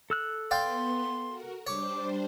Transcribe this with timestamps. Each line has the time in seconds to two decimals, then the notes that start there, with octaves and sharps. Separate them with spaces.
0.10 A4 E6 F#6
0.51 B3 D5 F5 G5 C6
1.26 F#4 A#4
1.67 G3 D4 C5 C#5 D6